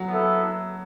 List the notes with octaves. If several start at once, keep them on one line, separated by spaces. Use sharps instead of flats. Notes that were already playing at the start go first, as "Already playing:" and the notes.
Already playing: F#3
B3 E4 A4